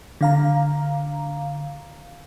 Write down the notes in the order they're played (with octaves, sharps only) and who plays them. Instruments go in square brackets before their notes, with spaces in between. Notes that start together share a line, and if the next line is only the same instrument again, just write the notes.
[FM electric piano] D3 F5 A#5